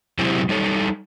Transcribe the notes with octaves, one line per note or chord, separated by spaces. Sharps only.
C3 F#3 G#3 C4 E4 G4
G3 D#4 A4 C#5